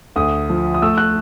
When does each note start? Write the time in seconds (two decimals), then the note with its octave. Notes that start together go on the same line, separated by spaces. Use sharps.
0.16 D2 D#6
0.50 F3
0.74 D#6
0.82 A3 E6
0.98 F#6